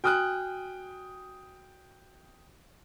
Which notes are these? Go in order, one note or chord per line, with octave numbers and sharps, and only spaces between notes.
F#4 G5 G#5 D#6 F6 F#6